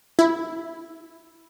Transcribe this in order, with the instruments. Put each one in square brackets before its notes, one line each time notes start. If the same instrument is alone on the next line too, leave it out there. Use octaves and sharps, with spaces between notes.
[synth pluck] E4